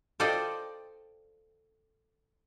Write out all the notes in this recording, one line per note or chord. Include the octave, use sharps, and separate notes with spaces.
F4 A4 C5 D5 D#5 G5